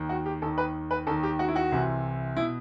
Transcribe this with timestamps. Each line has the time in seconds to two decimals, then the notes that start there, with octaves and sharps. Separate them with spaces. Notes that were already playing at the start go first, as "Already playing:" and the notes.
Already playing: D#2 D#3
0.09 F#4
0.26 G4
0.42 D#2 D#3 A4
0.58 B4
0.91 B4
1.07 D#2 D#3 A4
1.23 G4
1.39 F#4
1.48 E4
1.56 F#4
1.72 C2 C3 E3
2.37 B2 E4